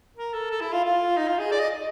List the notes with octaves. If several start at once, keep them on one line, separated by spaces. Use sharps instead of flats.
A#4
A4
A4
E4
F4
F4
D#4
F4
G#4
D5
D#5